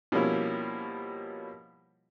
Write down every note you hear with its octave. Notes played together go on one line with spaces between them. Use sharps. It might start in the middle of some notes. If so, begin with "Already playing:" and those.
B2 F3 G3 A#3 C#4 E4